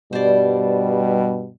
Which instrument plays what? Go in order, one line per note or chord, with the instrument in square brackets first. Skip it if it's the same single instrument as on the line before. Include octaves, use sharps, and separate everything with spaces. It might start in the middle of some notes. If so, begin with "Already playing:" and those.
[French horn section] G2 B2 G3 [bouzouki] C5 D5